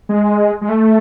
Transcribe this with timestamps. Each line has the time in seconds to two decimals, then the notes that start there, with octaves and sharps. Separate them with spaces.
0.09 G#3
0.61 G#3
0.69 A3